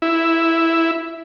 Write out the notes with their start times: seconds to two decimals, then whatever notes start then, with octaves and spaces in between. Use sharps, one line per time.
0.02 E4